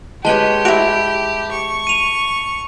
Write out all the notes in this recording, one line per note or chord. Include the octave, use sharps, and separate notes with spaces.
G#3 G4 B4 C#5 A5 G7
E4 F#4 D7 F7
C#6
D#7 F7